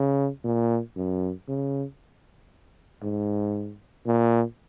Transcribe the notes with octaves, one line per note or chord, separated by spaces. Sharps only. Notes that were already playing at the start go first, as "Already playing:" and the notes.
Already playing: C#3
A#2
F#2
C#3
G#2
A#2